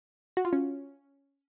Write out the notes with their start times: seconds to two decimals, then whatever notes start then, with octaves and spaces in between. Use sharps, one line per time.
0.37 F#4
0.45 F4
0.53 C#4